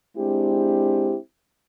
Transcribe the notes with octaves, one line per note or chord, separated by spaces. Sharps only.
G#3 C4 D4 E4 G4